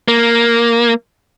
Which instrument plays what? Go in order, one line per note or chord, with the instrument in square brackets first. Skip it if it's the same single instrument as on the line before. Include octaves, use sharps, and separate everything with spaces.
[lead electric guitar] A#3